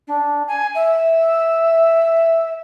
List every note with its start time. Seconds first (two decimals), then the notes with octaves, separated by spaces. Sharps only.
0.07 D4
0.48 G#5
0.75 E5